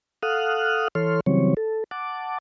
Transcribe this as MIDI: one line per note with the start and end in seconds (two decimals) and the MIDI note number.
0.23 0.88 69
0.23 0.88 77
0.23 0.88 78
0.23 0.88 87
0.23 0.88 89
0.23 0.88 90
0.95 1.20 52
0.95 1.20 69
0.95 1.20 73
0.95 1.20 84
0.95 1.20 89
1.26 1.54 49
1.26 1.54 52
1.26 1.54 54
1.26 1.54 55
1.26 1.54 60
1.26 1.54 73
1.57 1.84 69
1.91 2.38 78
1.91 2.38 81
1.91 2.38 86